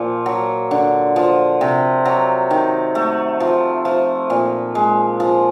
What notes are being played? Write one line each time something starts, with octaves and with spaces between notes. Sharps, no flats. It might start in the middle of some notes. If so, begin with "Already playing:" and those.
Already playing: A#2 F3
F#3
D3
F3
C3
F#3
D#3
A3
F3
F3
A#2
G#3
F3